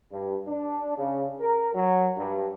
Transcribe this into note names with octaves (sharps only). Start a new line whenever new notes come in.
G2
D4
C#3
A#4
F#3
G2